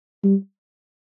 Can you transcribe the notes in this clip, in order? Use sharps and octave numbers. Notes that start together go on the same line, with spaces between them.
G3